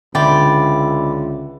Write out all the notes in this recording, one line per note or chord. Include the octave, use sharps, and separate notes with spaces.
C#2 D3 D5 E5 G5 B5